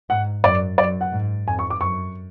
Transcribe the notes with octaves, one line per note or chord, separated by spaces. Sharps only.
G#2 F#5
F#2 D5
F#2 D5
F#5
G#2
F2 G#5
C#6
D6
F#2 C#6